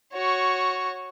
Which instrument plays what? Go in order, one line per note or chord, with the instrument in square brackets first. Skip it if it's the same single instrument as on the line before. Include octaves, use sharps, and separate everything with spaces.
[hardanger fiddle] F#4 C#5